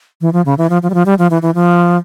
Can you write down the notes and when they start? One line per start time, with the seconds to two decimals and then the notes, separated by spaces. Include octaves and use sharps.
0.21 E3
0.33 F3
0.46 C#3
0.58 E3
0.70 F3
0.83 F3
0.90 G3
0.94 F3
1.06 G3
1.19 F3
1.31 E3
1.42 E3
1.55 F3